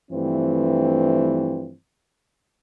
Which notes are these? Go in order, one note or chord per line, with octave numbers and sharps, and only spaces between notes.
G2 E3 F3 A3 C4